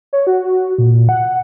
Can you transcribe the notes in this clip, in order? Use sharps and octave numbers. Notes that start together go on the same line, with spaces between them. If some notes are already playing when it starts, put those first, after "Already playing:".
C#5
F#4
A#2
F#5